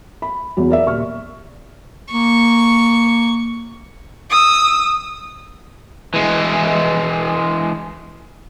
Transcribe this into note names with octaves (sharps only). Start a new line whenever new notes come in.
B5
E2 F#3
A#4 D5 E5
D#1 C#6 F6
A#3 C#6
D#6 E6
E3 G#3